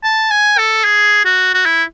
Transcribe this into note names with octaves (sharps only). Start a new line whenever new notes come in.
A5
G#5
A4
G#4
F#4
F#4
E4